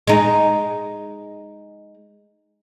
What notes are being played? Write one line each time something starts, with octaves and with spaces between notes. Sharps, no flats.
G#3 D#4